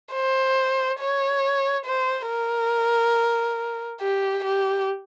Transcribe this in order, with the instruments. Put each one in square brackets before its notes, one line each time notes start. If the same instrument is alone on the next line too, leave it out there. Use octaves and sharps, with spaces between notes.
[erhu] C5
C#5
C5
A#4
G4
G4